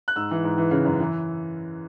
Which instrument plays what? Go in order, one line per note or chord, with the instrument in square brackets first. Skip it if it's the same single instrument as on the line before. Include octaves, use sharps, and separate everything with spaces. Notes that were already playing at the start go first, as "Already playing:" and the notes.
[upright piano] F#6
G#2 E6
E3
G#2
E3
C#3
F#2
E3